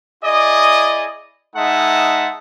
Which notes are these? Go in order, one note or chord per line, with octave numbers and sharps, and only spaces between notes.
E4 G#4 D5 D#5
G#3 D#4 E5 F#5 A5